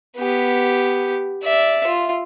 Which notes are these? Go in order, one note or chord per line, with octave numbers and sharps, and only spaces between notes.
B3 G4
D5 E5
F4